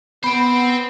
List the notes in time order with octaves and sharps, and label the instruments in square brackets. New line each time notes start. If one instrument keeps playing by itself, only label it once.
[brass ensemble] B3 [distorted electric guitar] C5 G5 [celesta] B5